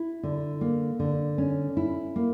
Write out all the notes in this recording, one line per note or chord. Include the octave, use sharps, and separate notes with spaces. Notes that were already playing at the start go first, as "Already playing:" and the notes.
Already playing: E4
D3
A#3
D3
C#4
E4
A#3